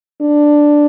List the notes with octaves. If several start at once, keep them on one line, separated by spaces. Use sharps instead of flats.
D4